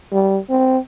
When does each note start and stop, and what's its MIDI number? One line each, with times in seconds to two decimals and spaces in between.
0.12 0.38 55
0.50 0.78 60